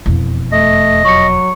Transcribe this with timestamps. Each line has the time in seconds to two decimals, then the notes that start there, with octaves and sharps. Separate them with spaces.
0.06 E1 F2
0.52 A3 D#5
1.05 F#3 C#6 C#7